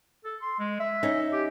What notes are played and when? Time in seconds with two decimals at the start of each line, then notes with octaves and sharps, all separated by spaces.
0.25 A4
0.42 C6
0.59 G#3
0.80 E5
1.03 C#4 D#4
1.32 G4